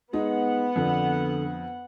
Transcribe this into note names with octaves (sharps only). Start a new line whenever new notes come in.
G#3 B3 D#4 F#5
F2 D3